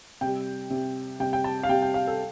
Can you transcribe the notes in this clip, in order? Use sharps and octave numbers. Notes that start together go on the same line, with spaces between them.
C3 G5
G3
C3 G3
C3 G3 G5
G5
A5
F5
C3 G3 G5
G5
F5
A4